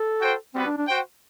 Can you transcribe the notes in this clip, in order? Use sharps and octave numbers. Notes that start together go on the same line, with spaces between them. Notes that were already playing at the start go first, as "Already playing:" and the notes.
Already playing: A4
F#4 C5 G5
G3 B3 C4 F#4 B4
D4
D4
F#4 C5 G5